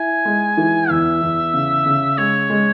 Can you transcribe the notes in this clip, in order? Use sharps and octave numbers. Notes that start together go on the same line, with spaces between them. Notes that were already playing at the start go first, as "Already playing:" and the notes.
Already playing: E4 G#5
G#3
E3
E2 E5
E2
C#3
C#3
G#3 C#5
G#3